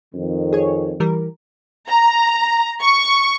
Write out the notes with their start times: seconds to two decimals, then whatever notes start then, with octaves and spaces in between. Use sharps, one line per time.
0.14 F2 D#3
0.53 G#4 C#5
1.00 E3 G3 A#4
1.88 A#5
2.82 C#6